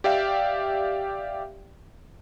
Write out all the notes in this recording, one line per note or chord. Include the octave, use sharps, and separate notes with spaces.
G4 D5 E5 F5 G5